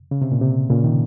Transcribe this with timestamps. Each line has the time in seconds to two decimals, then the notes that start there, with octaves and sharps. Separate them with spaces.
0.11 C#3
0.21 C3
0.32 A#2
0.42 C3
0.70 A#2 C#3
0.84 C3 D#3